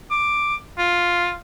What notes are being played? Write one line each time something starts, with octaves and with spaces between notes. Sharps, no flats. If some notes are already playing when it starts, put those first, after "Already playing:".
D6
F4